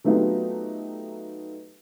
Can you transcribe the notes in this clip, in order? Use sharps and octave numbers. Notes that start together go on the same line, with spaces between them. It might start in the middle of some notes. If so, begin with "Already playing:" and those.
F#3 A3 B3 D#4 F4 G4